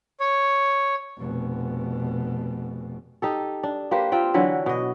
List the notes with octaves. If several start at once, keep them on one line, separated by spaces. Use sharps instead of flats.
C#5
F1 B2
D#4 G4 A4
D4
A#3 G4 B4 C5
A#3 C4 F4 G5
D3 E3 F#3 B4
B2 D#5